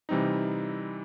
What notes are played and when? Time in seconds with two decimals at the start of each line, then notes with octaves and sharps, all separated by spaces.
0.09 C3 E3 G3 C4 D#4